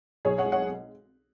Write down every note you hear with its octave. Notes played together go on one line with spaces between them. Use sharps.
B1 G#4 C#5
C#5 F#5
G#3
C#5 F#5